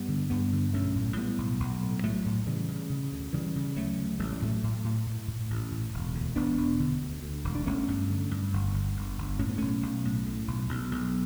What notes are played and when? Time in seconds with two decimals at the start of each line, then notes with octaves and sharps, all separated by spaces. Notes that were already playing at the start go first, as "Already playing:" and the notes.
Already playing: G2 G3 B3
0.08 D3
0.30 G2 G3 B3
0.53 D3
0.73 B1 A3 C#4
0.95 A2
1.17 A2 G3 B3
1.38 B1
1.60 B1
1.83 A2
2.03 A2 F#3 A3
2.26 A2
2.46 C#3 E3 G3
2.68 C#3
2.90 C#3
3.12 D2
3.33 C#3 E3 G3
3.56 C#3
3.76 D2 F#3 A3
3.99 D2
4.19 A1 A3
4.32 G3
4.42 A2 F#3 A3
4.63 A2
4.84 A2
5.06 A2
5.28 A2
5.50 A1
5.71 A2
5.94 E1
6.15 D2
6.36 E1 B3 D4
6.58 E1
6.80 D3
7.02 D2
7.22 D2
7.44 E1
7.55 D4
7.66 G1 A3 C#4
7.88 G2
8.10 D3
8.31 G2
8.53 G1
8.74 G1
8.97 G1
9.18 G1
9.39 A2 C#4
9.49 B3
9.58 B1 A3 C#4
9.82 B1
10.05 A2
10.26 A2
10.48 B1
10.69 B1
10.92 B1